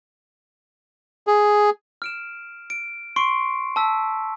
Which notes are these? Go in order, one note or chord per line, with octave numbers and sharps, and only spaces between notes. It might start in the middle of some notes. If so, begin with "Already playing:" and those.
G#4
F6 D7 E7
D7
C6 C#6 C7 D7
A5 E6 B6